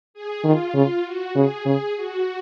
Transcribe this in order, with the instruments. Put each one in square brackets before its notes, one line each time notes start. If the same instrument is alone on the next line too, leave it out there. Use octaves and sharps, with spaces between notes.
[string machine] G#4
[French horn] D#3 [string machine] F4
[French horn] C#3 [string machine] F4
[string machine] F#4
[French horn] C#3 [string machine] G#4
[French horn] C#3 [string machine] G#4
[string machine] F#4